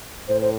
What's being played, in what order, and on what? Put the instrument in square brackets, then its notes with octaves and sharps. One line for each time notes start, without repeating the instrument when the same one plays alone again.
[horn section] A2 [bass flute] C5
[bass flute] C5